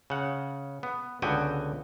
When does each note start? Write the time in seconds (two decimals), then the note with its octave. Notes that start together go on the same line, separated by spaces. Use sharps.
0.10 C#3 F#5
0.83 B3
1.22 C#2 D3 B3 F#4 G5 G#5